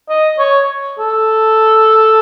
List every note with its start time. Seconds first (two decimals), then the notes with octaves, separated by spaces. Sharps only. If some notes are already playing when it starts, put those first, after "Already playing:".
0.09 D#5
0.39 C#5
0.99 A4